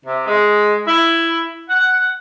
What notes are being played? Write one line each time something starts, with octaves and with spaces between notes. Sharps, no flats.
C3
G#3
E4
F#5